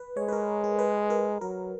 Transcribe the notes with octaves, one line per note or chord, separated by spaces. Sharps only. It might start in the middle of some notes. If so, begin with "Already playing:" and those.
Already playing: B4
G#3 C#5
B4
A#4
G#4
B4
A#4
F#3 A#4